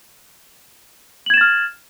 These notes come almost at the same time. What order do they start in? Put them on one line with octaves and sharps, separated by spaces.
F#7 G#6 E7 A6 F6